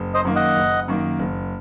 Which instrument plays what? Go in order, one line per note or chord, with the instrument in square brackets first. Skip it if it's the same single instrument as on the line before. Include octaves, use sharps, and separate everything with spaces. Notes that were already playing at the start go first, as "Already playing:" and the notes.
Already playing: [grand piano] F#1
[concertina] C5 D#5
[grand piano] F#2 D#3 A#3
[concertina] D#5 F#5
[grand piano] F#1
F#2 D#3 A#3
F#1